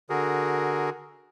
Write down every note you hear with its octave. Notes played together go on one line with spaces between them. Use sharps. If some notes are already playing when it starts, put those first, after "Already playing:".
D3 F#4 G#4 A#4